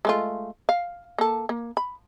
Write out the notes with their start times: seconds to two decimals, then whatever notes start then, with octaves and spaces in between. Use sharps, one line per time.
0.05 G#3 A3 F4
0.69 F5
1.18 A#3 A4
1.49 A#3
1.77 B5